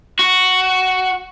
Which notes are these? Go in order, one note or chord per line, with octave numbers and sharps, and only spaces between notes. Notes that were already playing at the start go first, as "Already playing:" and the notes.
F#4